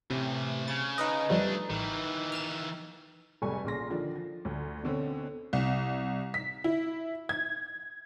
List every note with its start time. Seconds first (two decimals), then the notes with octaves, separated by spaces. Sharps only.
0.10 A2 C3 E3
0.68 C#3 A6
0.98 D#4 B4 D#5
1.30 F2 F3 G3 A3 D4
1.70 A1 D#3 E3
2.32 F6 E7
3.42 F1 G3 G#3 A4 G#5 C#6
3.64 A#1 C#3 C6 A#6
3.90 D3 D#3 F3 D4
4.16 F3
4.45 D2
4.83 B2 D3 C4 C#4
5.53 C2
6.34 B6
6.64 E4
7.29 G#6